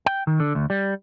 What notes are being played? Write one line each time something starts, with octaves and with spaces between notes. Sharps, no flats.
G5
D#3
D3
D2
G3